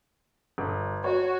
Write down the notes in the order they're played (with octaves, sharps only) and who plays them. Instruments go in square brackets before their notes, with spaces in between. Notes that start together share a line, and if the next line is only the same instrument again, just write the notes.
[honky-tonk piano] G1
[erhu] F#4 [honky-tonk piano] C#5